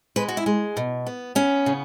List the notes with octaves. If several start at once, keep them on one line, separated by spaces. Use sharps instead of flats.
G#3 B4
F#4
E4
G#3
B2
B3
B3 C#4
C#3